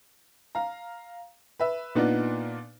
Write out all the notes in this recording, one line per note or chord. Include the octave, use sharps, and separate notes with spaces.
F5 A#5
B4 E5
A#2 B3 D4 D#4 F4